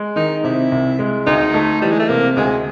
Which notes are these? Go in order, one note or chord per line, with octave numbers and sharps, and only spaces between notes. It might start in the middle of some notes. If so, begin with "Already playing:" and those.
Already playing: G#3
D#3 D#4
C3 E4
C2
G#3
D2 D#4
A3
E3 G3
G#3
A3
C3 A#3
D2 G#3